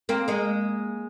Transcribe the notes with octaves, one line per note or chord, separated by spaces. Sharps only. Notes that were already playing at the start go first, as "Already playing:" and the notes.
A#3 C4
G#3 A#3